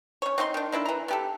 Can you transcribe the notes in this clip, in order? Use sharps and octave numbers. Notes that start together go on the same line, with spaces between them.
C#4 C#5
C4 D#4 E5 C6
D#3 D4
A#3 D4 E4 A4
E3 A#5
B3 G4 A4